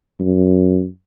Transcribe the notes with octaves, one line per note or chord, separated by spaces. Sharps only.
F#2